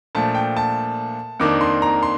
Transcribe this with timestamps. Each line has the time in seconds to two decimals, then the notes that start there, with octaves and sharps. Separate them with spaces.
0.15 A#2 F3 A3 D4 A5
0.35 G5
0.57 A5
1.40 F2 D#3 A#3 D4 D6
1.61 C6
1.82 A#5
2.03 C6